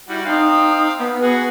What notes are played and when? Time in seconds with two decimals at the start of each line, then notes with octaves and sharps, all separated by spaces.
0.09 G3 E4 F#4
0.25 C4 D#4 F5 G5
0.98 B3
1.21 F#4 G#4